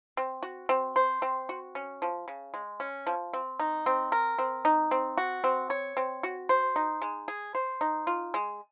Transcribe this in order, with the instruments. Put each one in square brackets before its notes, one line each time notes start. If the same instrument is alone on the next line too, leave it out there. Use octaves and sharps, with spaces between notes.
[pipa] C4
F#4
C4
C5
C4
F#4
C#4
F3
C#3
G#3
C#4
F3
C4
D#4
C4
A#4
C4
D#4
C4
F#4
C4
C#5
C4
F#4
C5
D#4
G#3
G#4
C5
D#4
F4
G#3